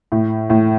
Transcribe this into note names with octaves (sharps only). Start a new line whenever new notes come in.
A2
A2